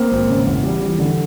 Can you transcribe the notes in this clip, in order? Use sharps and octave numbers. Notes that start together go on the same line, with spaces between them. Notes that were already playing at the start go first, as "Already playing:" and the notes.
Already playing: A#3 C4
G#1
C#3
E2
G3
E3
D3